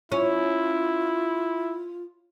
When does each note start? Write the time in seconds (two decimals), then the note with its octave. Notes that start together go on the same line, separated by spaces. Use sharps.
0.12 C#4 E4 F4